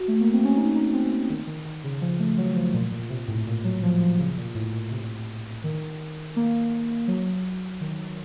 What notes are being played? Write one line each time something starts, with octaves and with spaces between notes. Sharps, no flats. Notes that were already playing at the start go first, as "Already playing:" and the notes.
Already playing: F#4
A3
A#3
C4
C#4
D#4
D#4
C4
D#3
D#3
D#3
C#3
F3
A3
F#3
F3
A#2
A#2
C3
A2
A#2
F#3
F3
F3
C#3
A#2
A2
A#2
C3
D#3
A#3
F#3
D#3